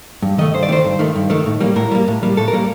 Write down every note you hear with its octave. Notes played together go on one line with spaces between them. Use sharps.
G2
D#3 A3 D#5
G2 C5
D5
D#3 A3 C5
G2
D#3 A3
G2
D#3 A3
A2
G3 A#3
A2 A#4
G3 A#3
A2
G3 A#3
A2 A4
A#4
G3 A#3